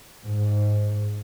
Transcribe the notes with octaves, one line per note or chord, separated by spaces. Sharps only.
G#2